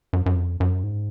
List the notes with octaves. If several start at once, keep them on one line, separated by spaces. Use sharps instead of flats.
F#2
F#2
F2
F#2
G#2